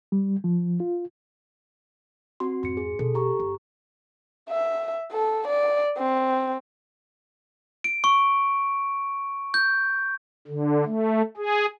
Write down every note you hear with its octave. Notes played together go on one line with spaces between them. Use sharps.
G3
F3
F4
C4 F#4 C6
F2 G#2 C6 C#7
G#4
B2 D4 A4
G4 A#5 C#6
G1 B3
E5
A4
D5
C4
D7
C#6
G6
D3
A3
G#4